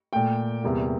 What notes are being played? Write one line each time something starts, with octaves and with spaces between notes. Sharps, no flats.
A#2 A3 G5
E2 C3 G3 A#3